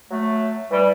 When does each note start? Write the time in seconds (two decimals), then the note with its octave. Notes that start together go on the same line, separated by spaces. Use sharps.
0.11 F#3 A3
0.71 E3 G3